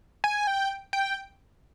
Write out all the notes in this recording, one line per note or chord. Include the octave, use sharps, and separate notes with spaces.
G#5
G5
G5